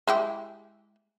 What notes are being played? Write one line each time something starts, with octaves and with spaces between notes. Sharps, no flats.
G#3 E4 G4